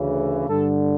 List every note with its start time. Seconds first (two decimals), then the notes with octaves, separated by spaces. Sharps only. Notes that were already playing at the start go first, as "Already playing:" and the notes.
Already playing: D2 C#3 E3
0.48 G2 D3 A4